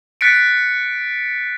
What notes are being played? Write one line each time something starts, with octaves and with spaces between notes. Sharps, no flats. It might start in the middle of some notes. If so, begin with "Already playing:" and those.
F#6 A6 B6 C#7 D7